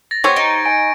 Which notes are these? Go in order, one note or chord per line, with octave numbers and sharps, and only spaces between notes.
A6 A#6
A3 B3 G4 C5 C#5 C#6 G#6
D#4 D7
G#5 D7